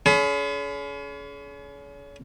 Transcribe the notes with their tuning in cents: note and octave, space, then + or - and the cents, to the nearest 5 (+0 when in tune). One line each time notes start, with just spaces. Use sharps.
C#4 +35 G#4 +40 B5 +40